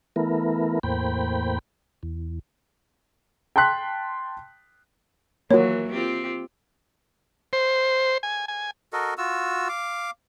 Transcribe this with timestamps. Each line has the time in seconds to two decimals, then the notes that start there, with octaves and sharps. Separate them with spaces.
0.16 E3 A3 B3 E4 A#4
0.83 E2 A2 A#3 C5 G5 B5
2.03 E2
3.56 G5 A5 C6 F#6 B6
5.51 E3 F#3 A#3 F#4 C#5
5.90 C4 F4 G4
7.53 C5
8.23 G#5
8.48 G#5
8.93 F#4 A4 A#4 D#5
9.18 F4 F#4 E6
9.69 F5 D6